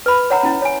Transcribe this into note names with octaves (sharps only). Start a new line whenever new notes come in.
B4 B5
C#5 F#5 A#5
C#4 E4
C#5 G#5